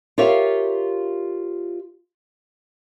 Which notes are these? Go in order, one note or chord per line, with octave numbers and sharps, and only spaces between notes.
F4 G4 A#4 C#5 E5 F5